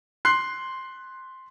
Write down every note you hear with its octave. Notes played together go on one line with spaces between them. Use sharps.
C6 F#6 C7